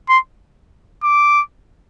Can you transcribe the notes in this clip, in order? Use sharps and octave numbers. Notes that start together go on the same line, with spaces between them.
C6
D6